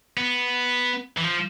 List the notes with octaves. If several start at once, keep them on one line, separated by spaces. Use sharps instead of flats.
B3
E3
F3